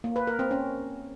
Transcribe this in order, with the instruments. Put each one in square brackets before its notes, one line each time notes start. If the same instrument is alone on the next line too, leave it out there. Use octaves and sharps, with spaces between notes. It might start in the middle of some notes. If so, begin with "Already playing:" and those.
[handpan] A#3
B4
A#4
C4
C#4